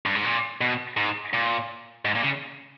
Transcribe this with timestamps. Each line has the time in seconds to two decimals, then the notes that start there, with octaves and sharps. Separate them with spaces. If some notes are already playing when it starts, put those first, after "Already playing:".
0.06 G2
0.15 G#2
0.25 A#2
0.61 B2
0.97 G#2
1.34 A#2
2.05 G#2
2.15 A#2
2.24 C#3